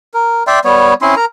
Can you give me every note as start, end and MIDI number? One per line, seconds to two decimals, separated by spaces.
0.14 0.43 70
0.47 0.59 74
0.47 0.59 76
0.47 0.59 79
0.47 0.59 84
0.65 0.94 55
0.65 0.94 59
0.65 0.94 73
1.02 1.15 60
1.02 1.15 61
1.02 1.15 64
1.02 1.15 84
1.16 1.25 70
1.16 1.25 82